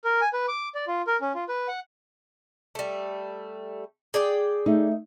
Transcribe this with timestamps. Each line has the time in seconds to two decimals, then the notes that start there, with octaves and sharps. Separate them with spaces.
0.05 A#4
0.21 G#5
0.33 B4
0.48 D6
0.75 D5
0.87 F4
1.07 A#4
1.21 C#4
1.34 F4
1.49 B4
1.68 F#5
2.75 G3 A3
4.14 G#4 D5 G5
4.66 A3 D#4